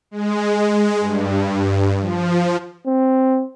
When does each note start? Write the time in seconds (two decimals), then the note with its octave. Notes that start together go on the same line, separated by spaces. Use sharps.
0.11 G#3
1.00 G2
2.00 F3
2.87 C4